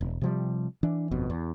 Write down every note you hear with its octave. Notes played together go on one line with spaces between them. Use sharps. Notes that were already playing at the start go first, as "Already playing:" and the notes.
E1
C3 F3 G3
E3 D4
G1 F2 B2
E2